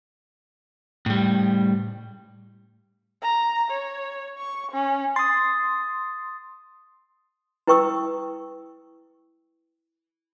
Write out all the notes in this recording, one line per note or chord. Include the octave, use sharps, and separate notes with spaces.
A2 G3
A#5
C#5
C#6
C#4
C6 D#6 A6
E4 B4 G5 C#6 D#6 E6